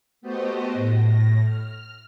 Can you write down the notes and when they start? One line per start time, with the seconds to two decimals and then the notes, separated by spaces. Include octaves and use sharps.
0.21 A3 B3 F#4 G4 C5 D#5
0.72 A2 A#6
1.40 F6